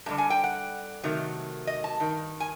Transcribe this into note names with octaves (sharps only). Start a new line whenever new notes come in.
G2 D3 G3 A5
G#5
G5
F#5
C3 D#3 F#3 A3
D#5
A5
G2 D#3
G#5